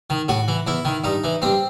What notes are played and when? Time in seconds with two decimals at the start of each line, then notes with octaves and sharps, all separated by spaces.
0.10 D#3
0.28 A2 F#4
0.48 E3
0.67 E2 E4
0.85 D#3
1.04 G2 D#4
1.24 E3
1.42 G2 C4